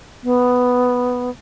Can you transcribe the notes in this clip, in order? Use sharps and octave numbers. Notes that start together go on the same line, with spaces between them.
B3